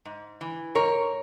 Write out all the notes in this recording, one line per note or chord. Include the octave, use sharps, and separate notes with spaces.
G#2
E3
G#2 A#4 C#5